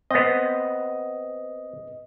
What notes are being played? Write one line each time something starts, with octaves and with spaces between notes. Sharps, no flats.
B3 C4 D#5